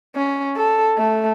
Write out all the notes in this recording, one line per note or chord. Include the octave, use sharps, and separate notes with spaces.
C#4
A4
A3